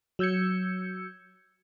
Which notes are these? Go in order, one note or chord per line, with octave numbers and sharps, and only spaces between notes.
F#3 E6 G6 G#6 C#7